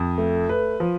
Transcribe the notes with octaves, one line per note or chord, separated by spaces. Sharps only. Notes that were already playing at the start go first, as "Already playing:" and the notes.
Already playing: F2
A3
B4
F3